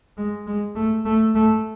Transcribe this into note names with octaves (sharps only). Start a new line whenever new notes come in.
G#3
G#3
A3
A3
A3